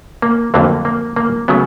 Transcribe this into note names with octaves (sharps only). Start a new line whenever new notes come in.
A#3
F2 D3 F#3 A3 A#3
A#3
A#3
C#3 F#3 A3 B3